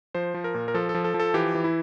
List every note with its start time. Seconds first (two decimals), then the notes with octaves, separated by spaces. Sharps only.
0.15 F3 C5
0.34 F3
0.44 A#4
0.55 A#2
0.68 A#4
0.74 F3 A4
0.89 A4
0.95 F3
1.04 A4
1.14 F3
1.20 A4
1.34 E3 G4
1.55 E3
1.64 E4